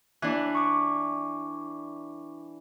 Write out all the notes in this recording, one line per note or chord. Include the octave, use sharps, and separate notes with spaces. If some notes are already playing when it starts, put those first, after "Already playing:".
E3 D4 F#6
C#6 D6